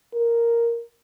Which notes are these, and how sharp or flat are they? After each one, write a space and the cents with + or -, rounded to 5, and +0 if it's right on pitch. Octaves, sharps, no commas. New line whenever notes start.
A#4 +0